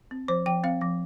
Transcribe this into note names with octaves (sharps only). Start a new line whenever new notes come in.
C4
F3 C5
F3 G5
C4 F5
F3